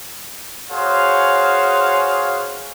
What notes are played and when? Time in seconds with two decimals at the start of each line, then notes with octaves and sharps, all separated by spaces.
0.70 F#4 G#4 C5 C#5 F5